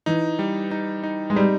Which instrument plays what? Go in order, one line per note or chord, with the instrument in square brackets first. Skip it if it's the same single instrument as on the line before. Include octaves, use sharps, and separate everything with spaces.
[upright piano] E3 [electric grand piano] D#4
[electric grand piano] G3
D#4
D#4
[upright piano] G#3
[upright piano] G3 [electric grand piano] D#4